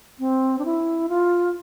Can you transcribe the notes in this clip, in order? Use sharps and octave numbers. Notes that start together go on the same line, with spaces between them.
C4
D4
E4
F4